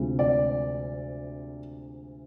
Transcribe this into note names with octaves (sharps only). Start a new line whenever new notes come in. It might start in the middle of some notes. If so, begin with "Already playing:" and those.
Already playing: D2 C3 F3 G#3 C4
D5